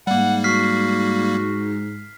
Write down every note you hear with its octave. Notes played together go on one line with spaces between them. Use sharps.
G#2 G3 A#3 F#5
F#4 F6 B6 C7